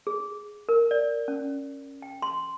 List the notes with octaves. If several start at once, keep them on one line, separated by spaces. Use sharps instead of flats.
G#4
A#4
D5
C#4
G5
C6